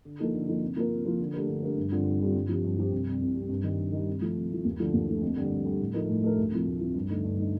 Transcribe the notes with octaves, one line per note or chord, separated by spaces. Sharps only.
D3
F3 A#3 D#4 A4
D3
F3 A#3 D#4 A4
C3
F3 A#3 F4 A#4
C3
F3 A#3 F4 A#4
D3
A3 D4 G4 A#4
D3
A3 D4 G4 A#4
G2
D3 G3 C4 F4
G2
D3 G3 C4 F4
G2
F3 C4 G4
G2
F3 C4 G4
C2
C3 G3
C2
G3
C3
G2
D#3 G3
G2
D#3 G3
C3
F3 A3
C3
F3 A3
D#2
D3 F3 A3
D#2
D3 F3 A3
F2
D3 G3
F2
D3 G3
A2
F3 A3 D#4 A#4
A2
F3 A3 D#4 A#4
D2
C3 F3
D2
C3 F3
G2
D3 A3 D#4
G2
D3 A3 D#4